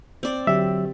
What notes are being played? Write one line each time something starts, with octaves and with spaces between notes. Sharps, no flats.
C4 D5
D3 F#3 G4 E5